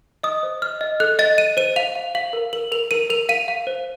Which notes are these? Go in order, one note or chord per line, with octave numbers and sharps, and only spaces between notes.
D#5 D#6
C5
D#5 F6
D#5
A4 F#6
D#5 A6
D#5 D#7
C5 D#7
F5 F7
F5
F5 F#7
A#4
A#4 F#7
A#4 F7
A#4 D#7
A#4 F7
F5 D#7
F5
C5